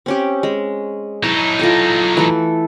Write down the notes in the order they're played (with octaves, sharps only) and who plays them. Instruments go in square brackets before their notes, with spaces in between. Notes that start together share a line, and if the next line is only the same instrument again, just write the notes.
[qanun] C4 C#4 G4
G#3
[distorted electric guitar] F#3 D#4 [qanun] E4 A5
[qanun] F4 A4 G5
E3 A3 A4